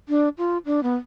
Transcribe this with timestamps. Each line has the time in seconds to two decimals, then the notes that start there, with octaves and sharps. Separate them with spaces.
0.09 D4
0.38 F4
0.66 D4
0.83 B3